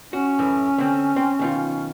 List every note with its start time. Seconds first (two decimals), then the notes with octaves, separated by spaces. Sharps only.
0.13 C#4 F#4
0.39 F#2 A2 E3
0.78 D3 C4
1.16 C4
1.39 B1 D#3 F4